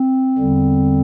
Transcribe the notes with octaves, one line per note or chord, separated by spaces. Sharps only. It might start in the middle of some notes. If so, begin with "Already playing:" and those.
Already playing: C4
E2 D3 G3